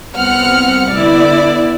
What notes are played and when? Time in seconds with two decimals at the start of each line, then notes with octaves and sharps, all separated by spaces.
0.16 C2 B3 C4 F#5 F6 C#7
0.94 D3 B3 E4 D5